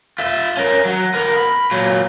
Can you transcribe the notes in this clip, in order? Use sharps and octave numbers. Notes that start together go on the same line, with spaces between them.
F4 E5
C#4 A#4
F#3
B3 A#4
B5
A#2 F#3